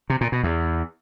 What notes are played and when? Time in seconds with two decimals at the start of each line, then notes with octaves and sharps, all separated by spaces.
0.10 C3
0.21 A#2
0.32 B2
0.43 E2